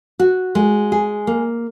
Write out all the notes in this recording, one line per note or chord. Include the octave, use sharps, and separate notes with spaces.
F#4
G#3
G#4
A#3